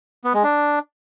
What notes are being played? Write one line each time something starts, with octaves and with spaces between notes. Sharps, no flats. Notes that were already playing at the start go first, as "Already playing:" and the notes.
B3
G#3
D4